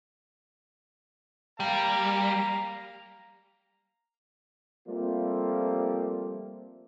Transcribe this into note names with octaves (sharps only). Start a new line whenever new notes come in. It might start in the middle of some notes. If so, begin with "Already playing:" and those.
G3 F5 A#5
F3 G3 A3 A#3 C4 F4